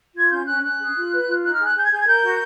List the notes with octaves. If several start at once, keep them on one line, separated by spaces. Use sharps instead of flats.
F4 G#6
C#4 G6
C#4 F#6
C#4 F#6
G#4
F4
B4
F4
D#4 F#6
F6
G#4
F#6
G#4 G6
G#6
G#4 G6
G#6
A#4 G6
F#4